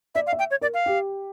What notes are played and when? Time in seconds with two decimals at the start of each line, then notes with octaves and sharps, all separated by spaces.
0.15 D5 E5
0.27 F5
0.33 E5
0.39 G5
0.51 C#5
0.61 A#4 D5
0.74 F5
0.86 G4